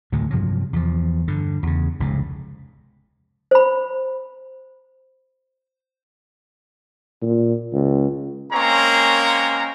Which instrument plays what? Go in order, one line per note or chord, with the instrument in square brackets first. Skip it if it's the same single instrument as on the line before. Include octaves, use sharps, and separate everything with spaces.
[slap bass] D2 A2 C3 D#3
G2 C3 F3 F#3
E2 F3
G2 D3
E2 C#3
F1 C#2 G#2
[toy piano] C5 B5
[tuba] A#2
C#2
[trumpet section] G#3 A#3 C4 C#4 C#5 A#5